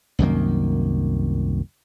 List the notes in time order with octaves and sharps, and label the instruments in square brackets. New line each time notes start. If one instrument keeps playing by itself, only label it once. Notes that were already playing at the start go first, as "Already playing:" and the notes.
[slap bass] C2 F#2 D#3 A#3